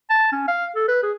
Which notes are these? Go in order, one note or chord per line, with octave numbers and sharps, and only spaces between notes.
A5
C#4
F5
A4
B4
G#4